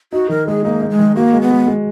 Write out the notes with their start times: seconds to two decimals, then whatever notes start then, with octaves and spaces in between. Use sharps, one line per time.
0.13 D#4 F#4
0.29 D#3 A#4
0.47 G#3 G#4
0.65 A#3 D#4
0.81 D#4
0.90 G#3
0.99 D#3
1.16 A#3 F#4
1.33 G#3
1.42 B3
1.50 G#3
1.67 G#3